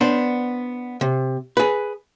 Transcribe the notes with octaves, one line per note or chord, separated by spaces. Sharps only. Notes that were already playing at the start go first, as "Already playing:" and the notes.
B3 D4 C5
C3
G#4 B4